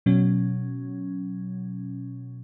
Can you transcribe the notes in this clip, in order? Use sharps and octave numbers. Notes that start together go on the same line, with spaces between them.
B2 F#3 C#4